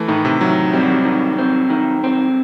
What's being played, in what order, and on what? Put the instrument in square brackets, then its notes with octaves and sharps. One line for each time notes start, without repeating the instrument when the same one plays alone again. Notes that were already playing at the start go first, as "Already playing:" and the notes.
Already playing: [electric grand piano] E3 A3
[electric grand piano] A2 [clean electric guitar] D#3
[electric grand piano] C3
[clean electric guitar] D#3 [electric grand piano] F#3
[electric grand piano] G3 [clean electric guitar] C4
[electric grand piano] F#3
G3
[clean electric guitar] D#3
C4
D#3
C4